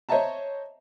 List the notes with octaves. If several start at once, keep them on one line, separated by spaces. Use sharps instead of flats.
C5 C#5 D#5 E5 A5 A#5